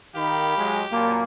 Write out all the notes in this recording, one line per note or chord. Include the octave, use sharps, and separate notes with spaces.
D#3 G4 F5 B5
F#3 G#3
F#2 A#2 A#3 F4 A5 B5